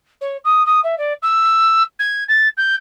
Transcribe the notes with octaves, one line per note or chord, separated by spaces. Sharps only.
C#5
D#6
D#6
E5
D5
E6
G#6
A6
G6